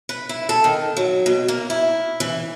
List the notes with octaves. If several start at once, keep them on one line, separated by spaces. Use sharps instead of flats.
B4
E4
A4
D#3
F#3
B2
A#3
E4
E3